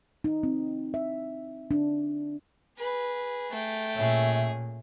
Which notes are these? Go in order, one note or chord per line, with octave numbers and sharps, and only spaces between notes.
D#4
C4
E5
D4
G#4 B4
A3 G5
A#2 C#4 G#4 E5